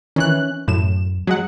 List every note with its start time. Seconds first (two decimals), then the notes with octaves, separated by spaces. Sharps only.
0.16 D#3 E3 C#4 F#6
0.68 F#2 A2 E7
1.27 F#3 G#3 F#5